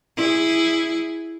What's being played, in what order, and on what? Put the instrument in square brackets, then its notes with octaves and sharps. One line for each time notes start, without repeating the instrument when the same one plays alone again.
[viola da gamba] E4 G#4